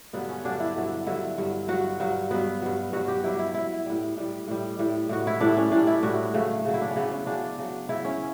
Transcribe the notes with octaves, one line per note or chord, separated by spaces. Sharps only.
G2 D3 F#3 B3
C#4
G2 D3 F#3 D4
E4
G2 D3 F#3
G2 D3 F#3 E4
G2 F#3
G2 F#3 F#4
G2 F#3
G2 F#3 B3
G2 F#3
G2 F#3 F#4
G4
G2 F#3 E4
E4
G2 F#3 E4
A2 G3
A2 G3
A2 G3
A2 G3
A2 G3 F#4
E4
A2 G3 D4
C#4
A2 G3 D4
E4
A2 G3 F#4
C#3 F#3 A3
C#3 F#3
E4
D4
C#4
C#3 F#3 B3
C#4
C#3 F#3 D4
C#3 F#3
C#3 F#3 E4
C#4